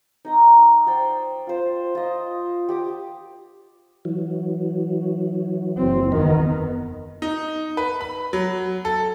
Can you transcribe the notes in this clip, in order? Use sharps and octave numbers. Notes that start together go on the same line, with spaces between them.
D#4 D#5 A#5
C5 D5 G5
F4 C5
F4 D#5
G4 D6 D#6
E3 F#3
F#1 C4
E2 D#3 B3 D#4 A#4
D#4
B4
B5
F#3
A4